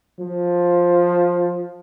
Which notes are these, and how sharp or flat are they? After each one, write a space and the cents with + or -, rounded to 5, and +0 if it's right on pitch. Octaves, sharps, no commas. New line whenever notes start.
F3 +10